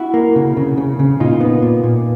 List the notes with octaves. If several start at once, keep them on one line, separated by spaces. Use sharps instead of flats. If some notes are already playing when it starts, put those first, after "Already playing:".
Already playing: E4 F#4
A#3
C#3
C#3
C#3
C#3
A#2 D#4 F4
B3
A#2
A#2